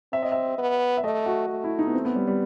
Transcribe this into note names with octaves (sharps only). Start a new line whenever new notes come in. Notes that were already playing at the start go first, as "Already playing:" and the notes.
C4 E5
D#5
E5
B3
E5
A3 D#5
F#4
A3
E4
D#4
B3
C4
B3
G3
G3